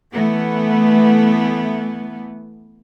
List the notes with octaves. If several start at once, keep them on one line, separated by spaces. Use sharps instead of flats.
E3 A3 B3